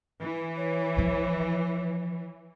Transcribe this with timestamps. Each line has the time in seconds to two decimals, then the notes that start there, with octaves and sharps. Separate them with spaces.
0.21 E3
0.57 C#5
0.97 F3 F4